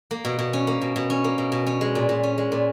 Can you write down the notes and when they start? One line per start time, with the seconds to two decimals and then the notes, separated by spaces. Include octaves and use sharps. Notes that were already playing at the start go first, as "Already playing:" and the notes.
0.11 A#3
0.25 B2
0.39 B2
0.53 C#4
0.67 A#3
0.82 B2
0.96 B2
1.10 C#4
1.24 A#3
1.38 B2
1.52 B2
1.67 C#4
1.81 G#3
1.95 A#2
2.09 A#2
2.23 C#4
2.38 G#3
2.52 A#2